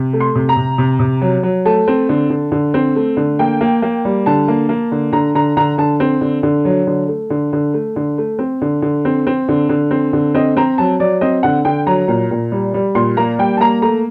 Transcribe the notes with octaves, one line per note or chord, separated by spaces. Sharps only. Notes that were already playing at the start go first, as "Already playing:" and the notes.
Already playing: C3
A3
C6
C3
A#5
C3
C3
C3
F#3
F#3
A3 A5
C4
D3
D3
D3
C4
A3
D3
A#3 G5
A#3
A#3
G3
D3 A5
A#3
A#3
D3
D3 A#5
D3 A#5
D3 A#5
D3 A5
C4
D3
D3
F#3
D3
A3
D3
D3
A3
D3
A3
C4
D3
D3
C4
C4
D3
D3
C4
D3
C4 D#5
C4 A#5
F#3 A5
F#3 D5
C4 D#5
D3 F#5
D3 G5
F#3 A#5
A#2
A#2
G3
G3
A#2 C6
A#3 A#5
G3 G5
A5
A#3 A#5
A3 A#5